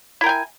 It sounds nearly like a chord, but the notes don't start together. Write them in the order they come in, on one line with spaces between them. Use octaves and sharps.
E4 A#4 G5 G#5